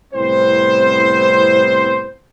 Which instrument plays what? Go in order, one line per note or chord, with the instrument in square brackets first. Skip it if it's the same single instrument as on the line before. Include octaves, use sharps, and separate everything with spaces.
[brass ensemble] C2 A2 B3 C4 C5